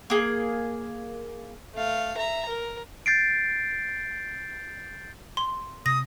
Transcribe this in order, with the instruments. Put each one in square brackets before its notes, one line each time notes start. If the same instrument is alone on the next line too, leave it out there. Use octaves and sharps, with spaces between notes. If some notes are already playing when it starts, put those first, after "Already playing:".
[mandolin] A#3 G#4
[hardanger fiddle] A3 F5
E5 A#5
A#4
[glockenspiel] G6 A6 C7 D7
[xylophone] C6
[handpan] C3 [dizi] D#6 [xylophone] A#6